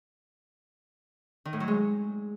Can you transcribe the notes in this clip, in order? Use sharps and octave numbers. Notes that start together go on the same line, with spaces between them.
D#3
A2
F#3
G#3